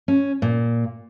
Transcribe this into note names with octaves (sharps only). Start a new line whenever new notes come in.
C#4
A#2